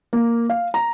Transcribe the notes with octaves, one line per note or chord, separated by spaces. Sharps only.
A#3
F5
A#5